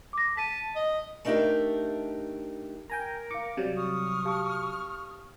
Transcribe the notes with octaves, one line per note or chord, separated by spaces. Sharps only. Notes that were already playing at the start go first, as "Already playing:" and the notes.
D6 A#6
A5 B6 D#7
D#5
A3 D4 D#4 F#4 G4 A#4
A#4 G5 G#5 A#5
F5 D6 C#7
C3 F#3 G3 D5
C#6 D#6 F6
G4 F5 A5